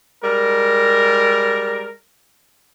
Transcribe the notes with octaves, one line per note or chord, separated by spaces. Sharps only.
G3 G#3 A#4